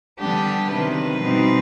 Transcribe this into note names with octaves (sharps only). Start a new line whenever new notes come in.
D3 G3 B3 D4 G4
C3 D#3 F#3 B4
B2 G3 C4 D#4